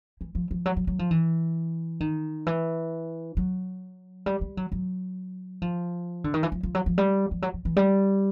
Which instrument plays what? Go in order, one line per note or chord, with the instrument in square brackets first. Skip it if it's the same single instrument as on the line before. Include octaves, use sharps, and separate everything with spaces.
[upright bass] E3
F3
F3
F#3
F#3
F#3
F3
E3
D#3
E3
F#3
G3
G3
F#3
F#3
F3
D3
D#3
E3
F3
F3
F#3
F3
G3
F3
F#3
F3
E3
G3